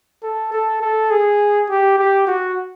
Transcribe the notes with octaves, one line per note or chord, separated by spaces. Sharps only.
A4
A4
A4
G#4
G4
G4
F#4